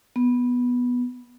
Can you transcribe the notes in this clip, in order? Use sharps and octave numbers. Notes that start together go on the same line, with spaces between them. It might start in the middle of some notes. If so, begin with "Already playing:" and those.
B3